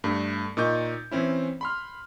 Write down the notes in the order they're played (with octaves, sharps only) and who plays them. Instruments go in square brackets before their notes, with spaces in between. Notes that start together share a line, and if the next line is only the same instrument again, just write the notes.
[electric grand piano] G2 A3
A#2 D#4 C#6 G6
E3 C4 C#4 E4
B5 C6 F6